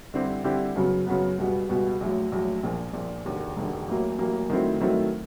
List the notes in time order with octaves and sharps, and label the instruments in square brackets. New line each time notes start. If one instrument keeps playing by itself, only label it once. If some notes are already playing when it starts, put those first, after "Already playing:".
[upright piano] D3 G3 C4 E4 G4
D3 G3 C4 E4 G4
F#2 C#3 F#3 B3
F#2 C#3 F#3 B3
C#2 B2 G3 B3
C#2 B2 G3 B3
A#1 A2 F#3
A#1 A2 F#3
A#1 A#2 F3
A#1 A#2 F3
E1 D#2 D3
E1 D#2 D3
A1 A2 F#3 A#3
A1 A2 F#3 A#3
D#3 F#3 A3 C4 E4
D#3 F#3 A3 C4 E4